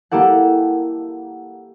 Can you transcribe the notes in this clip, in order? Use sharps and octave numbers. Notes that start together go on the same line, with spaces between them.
A#3 E4 G4 A4 F#5